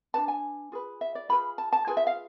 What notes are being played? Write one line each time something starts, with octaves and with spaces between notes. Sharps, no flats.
D4 G#4 B4 A5
G#5
F4 G#4 B4
E5
D5
F4 G#4 B4 B5
A5
A5
F4 G#4 B4 G#5
E5
F5